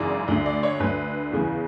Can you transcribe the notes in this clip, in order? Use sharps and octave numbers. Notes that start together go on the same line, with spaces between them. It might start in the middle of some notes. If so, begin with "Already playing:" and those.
Already playing: G#1 F#2 C#3 E3 D5
D2 D3
D5
C#5
D2 D3 B4
E2 C#3 E3